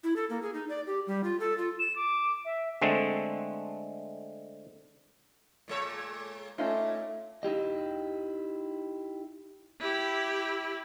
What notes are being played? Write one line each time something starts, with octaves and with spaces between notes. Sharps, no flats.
E4
A4
A#3
G#4
D#4
D5
G4
G3
F4
A4
F4
E7
D6
E5
D3 G#3 A3 C4
A#2 G#3 C#5
A#2 A3 C#4 D#4 F4 E5
D#4 E4 G4 D#5
E4 G4